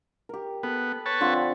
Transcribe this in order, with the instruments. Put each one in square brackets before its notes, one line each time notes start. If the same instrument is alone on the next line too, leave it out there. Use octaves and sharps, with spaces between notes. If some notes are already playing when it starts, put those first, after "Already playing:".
[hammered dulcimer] G4 A#4
[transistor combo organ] B3 [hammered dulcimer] A4
[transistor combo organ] B4 C#5 A5
[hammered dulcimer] D3 F3 C4